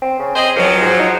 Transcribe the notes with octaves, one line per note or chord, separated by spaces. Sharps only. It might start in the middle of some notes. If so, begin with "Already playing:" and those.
C4
C#3
C4 G#4 C5 D#5
C#2 F3 F#3
G#2
D#4